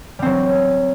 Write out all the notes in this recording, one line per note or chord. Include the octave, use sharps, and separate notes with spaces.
F#3 G3 C4